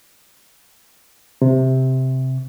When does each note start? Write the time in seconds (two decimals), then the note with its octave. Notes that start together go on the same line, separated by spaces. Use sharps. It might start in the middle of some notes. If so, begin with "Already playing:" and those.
1.42 C3